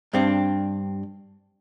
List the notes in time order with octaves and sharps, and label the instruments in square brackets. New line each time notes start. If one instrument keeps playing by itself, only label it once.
[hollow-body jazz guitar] G2 C4 D4